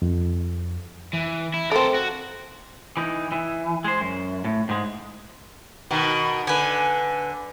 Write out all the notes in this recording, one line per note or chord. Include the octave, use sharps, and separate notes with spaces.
F2
E3
E4
A3 C4 A4 A#4
F#4
E3 D#4
E3
G#3 C5
F#2
A2
G#2 G#3
B2 D#3
D3 B4 G#5